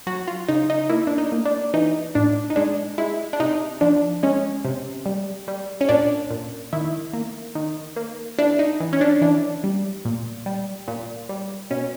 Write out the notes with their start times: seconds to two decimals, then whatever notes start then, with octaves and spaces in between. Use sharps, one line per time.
0.07 F#3 F#4
0.27 F4
0.49 C#3 D#4
0.70 D#4
0.90 A#3 E4
1.07 D4
1.18 D#4
1.32 A#3
1.45 D4
1.74 E3 D#4
2.15 A2 D4
2.50 D#4
2.56 G#3 D4
2.98 G#3 E4
3.33 D4
3.40 C3 D#4
3.81 F3 D4
4.23 G#3 C#4
4.65 C3
5.06 G3
5.48 G3
5.81 C#4
5.89 A#2 D4
6.31 A#2
6.73 D#3 E4
7.13 A#3
7.55 D#3
7.96 A#3
8.39 E3 D4
8.59 D#4
8.80 E3
8.93 C#4
9.01 D4
9.21 E3 D4
9.64 G3
10.05 A#2
10.46 G3
10.88 A#2
11.29 G3
11.71 B2 C#4